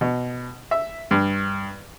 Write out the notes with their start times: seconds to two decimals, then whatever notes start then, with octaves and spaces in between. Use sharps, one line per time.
0.01 B2
0.71 E5
1.11 G2